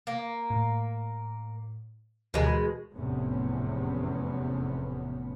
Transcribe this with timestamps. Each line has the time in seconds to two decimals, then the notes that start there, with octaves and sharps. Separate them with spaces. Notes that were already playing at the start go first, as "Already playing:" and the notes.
0.07 A#3
0.50 A2
2.34 D2 B2 E3 G#3 A#4
2.46 B5
2.95 F1 E2 A2 C3 B3 C#4